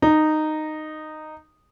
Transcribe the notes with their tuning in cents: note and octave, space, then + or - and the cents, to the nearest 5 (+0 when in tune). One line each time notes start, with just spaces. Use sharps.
D#4 -10